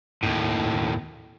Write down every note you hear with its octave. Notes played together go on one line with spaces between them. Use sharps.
D#2 A2